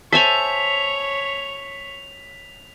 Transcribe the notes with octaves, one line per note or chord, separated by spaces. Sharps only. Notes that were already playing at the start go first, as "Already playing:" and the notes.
A4 C5 C#5 E5 G#5 B6 F7